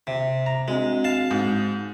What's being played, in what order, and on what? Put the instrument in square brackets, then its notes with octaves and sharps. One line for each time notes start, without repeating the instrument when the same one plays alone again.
[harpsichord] C3
[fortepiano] A#5
[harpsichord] G#3 [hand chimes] C4 D4 F#4
[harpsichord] F5 A5
[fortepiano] G#2